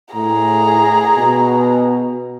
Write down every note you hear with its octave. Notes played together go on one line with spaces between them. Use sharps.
A2 G#4 A#5
B2